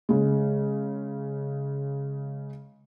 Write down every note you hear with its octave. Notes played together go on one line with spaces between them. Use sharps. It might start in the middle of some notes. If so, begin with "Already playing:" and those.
C#3 G#3